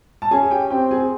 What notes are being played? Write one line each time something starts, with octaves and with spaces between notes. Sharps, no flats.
A5
C#4 G#4 G#5
G4 G5
C4 G4 G5
G#4 G#5